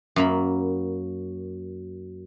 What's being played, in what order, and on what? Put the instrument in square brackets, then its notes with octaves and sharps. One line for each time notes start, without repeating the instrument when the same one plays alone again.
[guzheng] F#2 A#3 B5